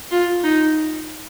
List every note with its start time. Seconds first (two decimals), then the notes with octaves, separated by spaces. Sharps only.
0.11 F4
0.44 D#4